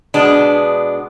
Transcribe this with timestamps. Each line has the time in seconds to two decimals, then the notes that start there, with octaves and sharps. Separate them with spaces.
0.14 B2 G#3 B3 D4